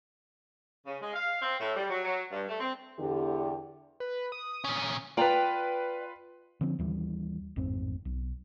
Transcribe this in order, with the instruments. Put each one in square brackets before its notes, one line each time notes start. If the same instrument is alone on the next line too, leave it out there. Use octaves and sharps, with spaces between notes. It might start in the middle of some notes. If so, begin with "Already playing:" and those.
[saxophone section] C#3
G#3
F5
C4
A2
G3
F#3
F#3
G2
A3
C4
[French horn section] E2 D3 G4
[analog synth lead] B4
D#6
[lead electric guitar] A#2 C#4
[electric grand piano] F4 B4 [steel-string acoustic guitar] D5 G5 A#5
[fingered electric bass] D3 F3 C4 C#4
D#2 E3 G3
A1 F2 G#2 C4
B1